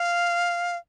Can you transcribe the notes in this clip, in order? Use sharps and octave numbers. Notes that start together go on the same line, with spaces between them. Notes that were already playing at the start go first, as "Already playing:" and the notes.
Already playing: F5